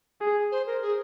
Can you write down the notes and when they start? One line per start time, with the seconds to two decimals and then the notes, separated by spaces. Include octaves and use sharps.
0.21 G#4
0.52 C5
0.67 A#4
0.82 G#4